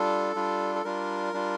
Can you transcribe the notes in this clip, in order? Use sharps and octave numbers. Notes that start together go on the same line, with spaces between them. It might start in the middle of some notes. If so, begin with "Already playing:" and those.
Already playing: G3 D4 F4 A4
G3 D4 F4
A4
G3 D4 F4 A#4
G3 D4 F4